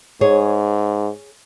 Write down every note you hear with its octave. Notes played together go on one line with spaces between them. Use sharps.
G#2 G#4 C#5